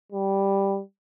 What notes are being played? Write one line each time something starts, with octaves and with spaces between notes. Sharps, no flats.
G3